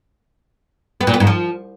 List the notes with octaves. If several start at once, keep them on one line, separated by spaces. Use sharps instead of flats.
B3
A#2
B3
G#2
F3